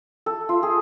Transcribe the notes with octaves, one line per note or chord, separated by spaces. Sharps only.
A4
F4
G#4